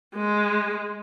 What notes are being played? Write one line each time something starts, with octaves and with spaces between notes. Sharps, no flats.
G#3